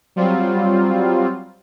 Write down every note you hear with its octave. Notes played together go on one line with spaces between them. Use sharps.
F#3 G3 C4 F4